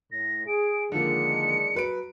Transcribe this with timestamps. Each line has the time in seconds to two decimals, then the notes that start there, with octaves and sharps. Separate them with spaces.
0.11 A2 A#6
0.47 G#4 D7
0.92 D3 D#3 F3 G#3 A#3 D4 C#7
1.74 F#3 B4 D7